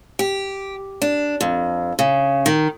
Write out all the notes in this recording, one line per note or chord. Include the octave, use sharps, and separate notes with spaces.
G4
D4
F2
C#3
D#3